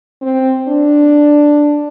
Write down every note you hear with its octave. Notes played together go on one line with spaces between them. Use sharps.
C4
D4